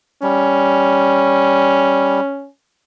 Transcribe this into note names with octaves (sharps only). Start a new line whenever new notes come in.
G3 C#4